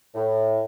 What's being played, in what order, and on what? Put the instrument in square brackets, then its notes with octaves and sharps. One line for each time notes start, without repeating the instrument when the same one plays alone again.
[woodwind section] A2